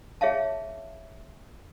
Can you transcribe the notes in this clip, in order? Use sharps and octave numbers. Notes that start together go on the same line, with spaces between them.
G#4 C#5 E5 F5 A5